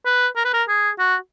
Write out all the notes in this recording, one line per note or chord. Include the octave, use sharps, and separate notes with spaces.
B4
A#4
B4
A#4
G#4
F#4